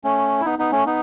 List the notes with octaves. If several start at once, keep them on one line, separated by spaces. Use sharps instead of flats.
A3 C#4
E4
B3 D#4
B3 D#4
A3 C#4
B3 D#4